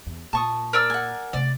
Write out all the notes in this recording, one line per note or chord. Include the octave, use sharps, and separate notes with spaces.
E2
A#2 A5 C#6 D#6
A#4 D5 E6
F#5 G#5
C3 A3 D5